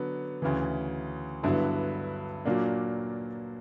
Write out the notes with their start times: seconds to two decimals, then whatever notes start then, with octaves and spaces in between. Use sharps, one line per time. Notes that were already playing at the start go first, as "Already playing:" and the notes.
Already playing: D3 F#3 B3
0.42 D2 C#3 E3
1.43 G2 D3 F#3 B3 E4
2.45 A#2 F#3 A#3 D4